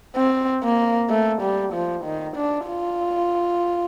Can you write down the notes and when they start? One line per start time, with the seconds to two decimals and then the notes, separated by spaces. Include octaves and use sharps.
0.16 C4
0.63 A#3
1.10 A3
1.41 G3
1.73 F3
2.05 D#3
2.36 D4
2.67 F4